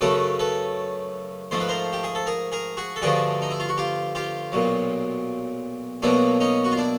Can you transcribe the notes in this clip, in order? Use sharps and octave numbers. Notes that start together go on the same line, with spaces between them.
F#2 C#3 F#3 A3 A4 B4
A4 B4
G#2 F3 A3 C5
B4
A#4 C5
G4
G#4
A4
G#4 A#4
G#4 A#4
F#4 G#4
A4
G2 D3 F3 A3 F#4 G#4
D#4
E4
F4
F#4
F4 G4
F4 G4
B1 A#2 F#3
B1 B2 F#3 A#3 D4 E4
C#4 D#4
F#4
F4
D4 E4